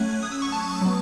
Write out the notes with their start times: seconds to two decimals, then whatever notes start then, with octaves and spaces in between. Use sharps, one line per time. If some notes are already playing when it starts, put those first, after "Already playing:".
Already playing: F#3 A3 C#4 F#6 G#6
0.23 D#6
0.32 E6
0.42 C#6
0.52 A5
0.81 F#3 B3